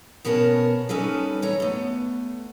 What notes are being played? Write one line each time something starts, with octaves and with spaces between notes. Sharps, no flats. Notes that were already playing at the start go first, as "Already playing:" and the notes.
B2 B3 C#4 A#4 A5
G3 C#4 D#4 A4 B4
E3 C#5 A#5
A3 B3